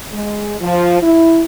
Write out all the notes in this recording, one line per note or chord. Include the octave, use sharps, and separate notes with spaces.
G#3
F3
E4